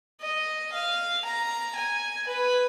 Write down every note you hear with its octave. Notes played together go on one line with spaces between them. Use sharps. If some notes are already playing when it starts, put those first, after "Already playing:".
D#5
F5
A#5
G#5
B4